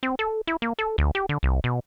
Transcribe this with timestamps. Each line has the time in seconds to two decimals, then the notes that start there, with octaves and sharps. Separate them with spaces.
0.03 C4
0.19 A4
0.47 E4
0.62 A#3
0.79 A4
0.98 D2
1.15 G4
1.29 D3
1.43 C2
1.64 B2